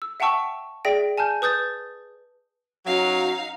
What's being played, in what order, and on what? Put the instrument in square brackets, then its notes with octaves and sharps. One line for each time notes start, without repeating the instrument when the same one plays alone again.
[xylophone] E6
E5 F#5 G5 A5 C#6 E6
G#4 D5 E5 G5 A#6 D7
G#5 A5 F6 G6
B4 D#6 G6 A6
[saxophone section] F#2 F#3 [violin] D#4 F5